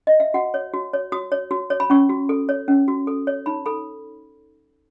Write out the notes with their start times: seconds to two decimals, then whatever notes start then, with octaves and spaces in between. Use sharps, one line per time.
0.07 D#5
0.20 E5
0.34 F#4 F#5
0.54 C#5
0.73 F#4
0.93 C#5
1.12 F#4 D#6
1.32 C#5
1.51 F#4
1.70 C#5
1.80 B5
1.90 C#4 C#6
2.09 F#4
2.29 A4
2.49 C#5
2.68 C#4
2.88 F#4
3.07 A4
3.27 C#5
3.46 D#4 B5
3.66 A4 B5